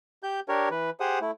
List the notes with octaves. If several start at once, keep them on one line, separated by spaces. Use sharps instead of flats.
G4 G6
D4 G4 A#4 C#5
E3 B4
G4 G#4 C5 F#5 D#6
A3 E4